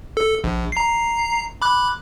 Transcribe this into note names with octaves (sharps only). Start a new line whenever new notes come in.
A4
A#1
A#5 C7
B5 D6 F#6